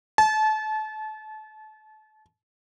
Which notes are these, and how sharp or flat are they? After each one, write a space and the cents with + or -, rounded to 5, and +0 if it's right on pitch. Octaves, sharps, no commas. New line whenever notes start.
A5 -30